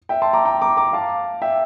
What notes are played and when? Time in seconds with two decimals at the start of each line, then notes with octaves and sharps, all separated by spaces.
0.09 E5 G5
0.22 A5 C6
0.33 A#5 D6
0.45 G5 A#5
0.62 A#5 D6
0.77 A#5 D6
0.93 F5 A5
1.42 E5 G5